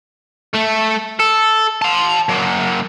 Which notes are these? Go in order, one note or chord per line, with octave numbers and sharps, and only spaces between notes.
A3
A4
A5 C6
F#3 A#3